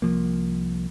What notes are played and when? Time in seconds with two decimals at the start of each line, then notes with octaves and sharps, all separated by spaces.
0.02 C2 F3 A#3